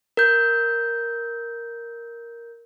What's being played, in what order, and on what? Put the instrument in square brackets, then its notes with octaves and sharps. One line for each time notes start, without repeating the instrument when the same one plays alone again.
[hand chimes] A#4 G6